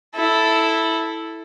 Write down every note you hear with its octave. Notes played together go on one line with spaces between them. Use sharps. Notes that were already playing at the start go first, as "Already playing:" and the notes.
E4 A4